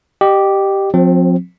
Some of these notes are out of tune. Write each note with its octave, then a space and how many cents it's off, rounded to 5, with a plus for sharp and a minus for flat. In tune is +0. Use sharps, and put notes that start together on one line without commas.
G4 -5 D#5 -30
F3 +35 C4 +0